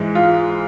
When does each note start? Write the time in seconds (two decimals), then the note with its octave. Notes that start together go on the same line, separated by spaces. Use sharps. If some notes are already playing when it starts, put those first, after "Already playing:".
Already playing: G#2 E3 G#3
0.15 F4